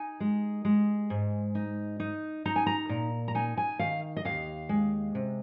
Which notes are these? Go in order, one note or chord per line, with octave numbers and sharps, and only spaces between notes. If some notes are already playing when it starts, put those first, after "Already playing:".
Already playing: D#4 G#5
G#3
G#3
G#2
D#4
D#4
D#4 A#5
G#5
A#5
A#2
A#5
D#4 G#5
G#5
D#3 F5
D#5
D#2 F5
G#3
C3